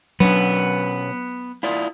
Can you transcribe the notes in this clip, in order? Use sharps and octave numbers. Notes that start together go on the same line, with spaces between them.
B2 F#3 B3 C#4 D4 B4
E4 F4 D5